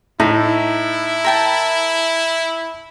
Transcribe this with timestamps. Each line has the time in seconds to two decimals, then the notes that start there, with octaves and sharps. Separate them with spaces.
0.20 A2 D#4 E4
1.24 A#4 G5 A5